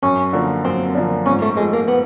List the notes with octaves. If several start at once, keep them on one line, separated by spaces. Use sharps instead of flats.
F#2 C#4
D3 F3 A#3 D4
F#2 C4
D3 F3 A#3 D4
G#2 C#4
A3
F3 G#3 A3
A#3
B3